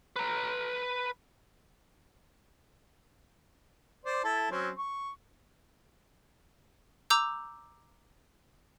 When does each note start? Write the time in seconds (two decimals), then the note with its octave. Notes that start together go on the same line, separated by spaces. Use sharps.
0.16 B4 A#5
4.05 C5 D5
4.24 E4 A4 A5
4.51 F#3 C4 C#4
4.78 C#6
7.10 A#5 D6 E6 G6